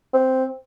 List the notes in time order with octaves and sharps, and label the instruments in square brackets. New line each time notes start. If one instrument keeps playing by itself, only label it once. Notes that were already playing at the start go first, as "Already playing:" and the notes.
[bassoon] C4